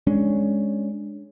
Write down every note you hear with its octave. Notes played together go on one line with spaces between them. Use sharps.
G#3 C#4 D4